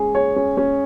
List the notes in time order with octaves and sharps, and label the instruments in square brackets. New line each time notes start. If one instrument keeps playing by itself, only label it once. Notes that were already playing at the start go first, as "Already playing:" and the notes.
Already playing: [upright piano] G#3 C#4 G#4
C#5
C#4
C#4